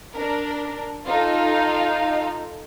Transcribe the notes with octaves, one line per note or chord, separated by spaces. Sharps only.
D4 A#4
D#4 F4 A4 F5